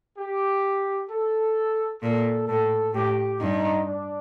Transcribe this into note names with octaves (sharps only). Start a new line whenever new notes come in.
G4
A4
A#2 A4
A2 A4
A2 G4
G2 D#4
D4